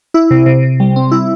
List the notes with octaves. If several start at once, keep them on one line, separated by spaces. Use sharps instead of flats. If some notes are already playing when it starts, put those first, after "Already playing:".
E4
C3
C3
C3
G3
C4
E4